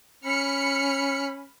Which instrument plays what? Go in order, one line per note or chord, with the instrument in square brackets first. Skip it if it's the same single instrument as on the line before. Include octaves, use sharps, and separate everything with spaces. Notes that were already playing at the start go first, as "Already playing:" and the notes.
[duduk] C#4 [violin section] B5 F6 C#7